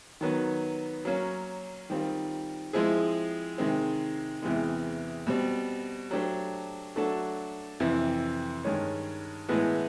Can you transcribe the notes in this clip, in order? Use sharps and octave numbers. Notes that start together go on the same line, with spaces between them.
D#3 F#3 B3
F#3 A#3 C#4
D#3 G3 C4 F4
F3 G#3 C4 E4 G#4
C3 D#3 G#3 C4
E2 C3 E3 G#3
B2 G3 C4
F#3 A3 D4 G4 C5
F#3 A3 D4 F#4 A4
F2 C3 E3
G2 D#3 G#3 C#4
A2 E3 G#3 B3